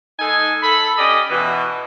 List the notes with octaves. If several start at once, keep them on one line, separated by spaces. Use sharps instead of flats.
G#3 D#4 A4 G#5
A4 B5
C#4 G4 D5 D#5
B2 E3